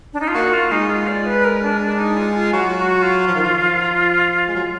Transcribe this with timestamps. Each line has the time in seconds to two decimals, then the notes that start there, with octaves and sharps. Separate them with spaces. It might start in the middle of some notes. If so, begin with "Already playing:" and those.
0.13 D4
0.20 D#4
0.28 F4
0.35 A#3 F#4
0.53 F4
0.71 G#3 D#4
0.89 F4
1.08 D5
1.26 B4
1.44 A#4
1.63 D4
1.81 D4
1.99 D#4
2.17 F4
2.35 F4
2.53 F#3 F#4
2.78 F#4
3.02 F4
3.27 F3
3.35 D#3
3.44 F3
4.48 G#3
4.55 F#3